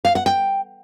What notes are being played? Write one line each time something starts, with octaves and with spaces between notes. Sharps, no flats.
F5
F#5
G5